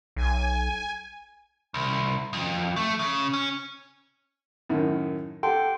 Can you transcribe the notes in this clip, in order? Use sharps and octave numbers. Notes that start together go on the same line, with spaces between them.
B1 G#5
C2
F2
A3
C#3
C#4
F#2 A2 D#3
G4 A4 F#5 G5 C6